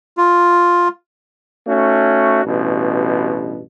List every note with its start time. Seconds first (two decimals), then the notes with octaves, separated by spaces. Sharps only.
0.17 F4
1.67 A3 C#4 D#4 F#4
2.44 A1 G2 B2